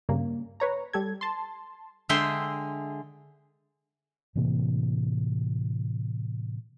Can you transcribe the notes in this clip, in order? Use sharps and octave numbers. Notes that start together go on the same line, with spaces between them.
G2 C#3 A#3
B4 C#5 A#5
G3 A4 G#6
A5 C6
D3 G#3 E5 G5 C6
A2 C3 E3 A#3